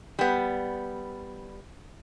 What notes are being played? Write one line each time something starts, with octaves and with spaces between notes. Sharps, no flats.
G3 B3